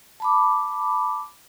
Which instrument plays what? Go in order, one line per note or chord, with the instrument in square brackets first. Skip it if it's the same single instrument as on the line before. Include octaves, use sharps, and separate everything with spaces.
[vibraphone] A5 B5 D6